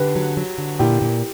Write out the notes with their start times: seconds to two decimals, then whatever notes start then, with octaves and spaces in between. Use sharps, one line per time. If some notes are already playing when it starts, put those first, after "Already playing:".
Already playing: D3 G4 B4
0.16 F#3
0.37 F#3
0.58 D3
0.79 A#2 E4 G4
1.02 A#2